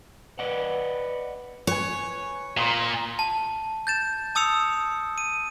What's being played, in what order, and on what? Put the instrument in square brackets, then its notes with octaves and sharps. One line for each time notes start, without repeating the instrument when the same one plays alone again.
[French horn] B4 [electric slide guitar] D5 D#5 F#5
[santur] B4 G#5 [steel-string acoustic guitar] C#5
[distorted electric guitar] A#2 [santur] A#5 C6 D#6
[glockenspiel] A5
G6 A6 E7
A5 D#6 E6 C#7 F7
D#7